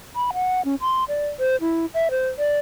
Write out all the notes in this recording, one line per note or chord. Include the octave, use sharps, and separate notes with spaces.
B5
F#5
C#4
C6
D5
C5
E4
E5
C5
D5